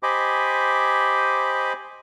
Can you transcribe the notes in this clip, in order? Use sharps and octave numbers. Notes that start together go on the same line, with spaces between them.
G4 C5 D#5 G#5 B5 D6